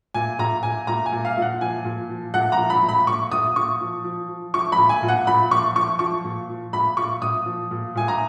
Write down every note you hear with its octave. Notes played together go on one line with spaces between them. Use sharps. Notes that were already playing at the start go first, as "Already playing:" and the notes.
A#2 G#5
A#2 A#5
A#2 G#5
A#2 A#5
G#5
A#2
F5
A#2 F#5
F3 G#5
A#2
F3
A#2 F#5
A#5
F3
B5
A#2
B5
A#2 C#6
A#2 D#6
A#2 C#6
F3
F3
F3
F3 C#6
B5
A#2
G#5
A#2
F#5
A#2 B5
F3 C#6
F3 C#6
F3 C#6
A#2
F3
A#2 B5
A#2 C#6
A#2 D#6
F3
A#2
A#2 G#5
A#5